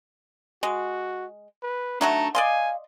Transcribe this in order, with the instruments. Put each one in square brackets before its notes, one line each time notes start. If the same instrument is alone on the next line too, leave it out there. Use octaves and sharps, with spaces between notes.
[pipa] G#3 [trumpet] F#4
[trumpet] B4
[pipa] F#3 A3 F#4 [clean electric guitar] D4 D#4 E5 [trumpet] A#5
[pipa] D5 D#5 C6 [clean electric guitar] F5 [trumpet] G#5